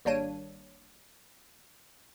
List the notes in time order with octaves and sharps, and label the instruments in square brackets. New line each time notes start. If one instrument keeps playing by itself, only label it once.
[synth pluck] G#1 G3 A#3 D4 C#5 D#7